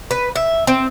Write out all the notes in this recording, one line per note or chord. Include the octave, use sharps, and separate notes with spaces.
B4
E5
C4